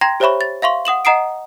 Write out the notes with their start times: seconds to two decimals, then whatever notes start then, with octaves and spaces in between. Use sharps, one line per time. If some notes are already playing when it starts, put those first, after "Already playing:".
0.01 G5 A#5 C6 G#6 A#6
0.20 G4 C5 C#5 E5 B5 C#6
0.41 A6
0.62 E5 F5 C6 C#6
0.85 F#5 D#6 E7 F#7
1.05 D#5 F#5 A#5 D#6 C7 D7